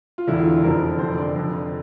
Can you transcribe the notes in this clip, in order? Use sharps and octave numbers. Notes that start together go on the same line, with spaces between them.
F4
E1 E2 D3 E4
F4
F1 F2 D3 F3 A#4
F1 F2 D3 C5
D5
F1 F2 D3